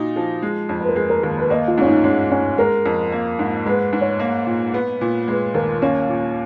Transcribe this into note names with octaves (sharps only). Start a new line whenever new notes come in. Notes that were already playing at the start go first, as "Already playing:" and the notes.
Already playing: A#2 D#4 F#4
F3
G#3
F2
B4
A#4
G#3 G#4
A#4
D#2 A#4
B4
A#3 D#5
F4
G#2 C#4
D#4
G#3 C#4
G#2 C#4
G#3 A#4
F2
A#3
G#2
G#3 B4
G#2
C#5
A#3
A#2
B3
A#2
G#3 B4
D#2 A#4
A#3 C#4
A#2